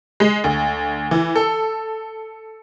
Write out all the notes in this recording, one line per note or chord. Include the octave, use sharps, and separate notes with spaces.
G#3
D2
E3
A4